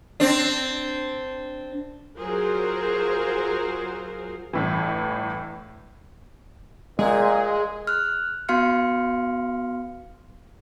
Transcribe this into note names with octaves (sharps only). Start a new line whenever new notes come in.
C4 D4
F#3 F4 G#4 A#4 C5
G1 A2 E3
A#2 G#3 G#4
F6 F#6
B3 F#4 F5 C6 F6 C#7